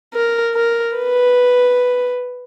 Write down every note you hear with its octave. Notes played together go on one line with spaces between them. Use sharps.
A#4
A#4
B4